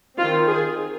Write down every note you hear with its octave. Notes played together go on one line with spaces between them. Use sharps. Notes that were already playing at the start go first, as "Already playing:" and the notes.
D#3 C4 F4
G#4